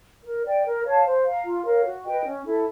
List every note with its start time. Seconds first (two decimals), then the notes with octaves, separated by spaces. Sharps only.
0.25 A#4
0.45 D5 G5
0.65 A#4
0.85 C#5 F5 A5
1.05 C5
1.25 F5 A#5
1.45 F4
1.65 A#4 C#5 F5
1.85 F#4
2.05 B4 D#5 G5
2.25 C#4
2.45 E4 A4